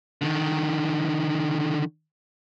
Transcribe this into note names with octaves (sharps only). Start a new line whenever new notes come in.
D3 D#3